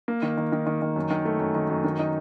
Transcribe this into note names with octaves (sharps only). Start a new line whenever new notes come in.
A#3
D#3
D#3
D#3
D#3
D#3
F#2
D#3
A3
F#2
D#3
F#2
D#3
D#4